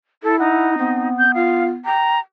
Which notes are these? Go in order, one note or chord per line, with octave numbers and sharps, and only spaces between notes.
E4 A4
D#4 F#5
B3 C4
G6
F4 F5
G5 A#5